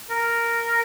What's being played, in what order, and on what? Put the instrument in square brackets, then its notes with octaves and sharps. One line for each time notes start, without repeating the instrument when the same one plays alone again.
[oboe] A#4